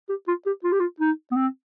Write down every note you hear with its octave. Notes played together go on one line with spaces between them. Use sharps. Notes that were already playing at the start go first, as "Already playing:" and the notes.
G4
F4
G4
F4
G4
F4
D#4
B3
C4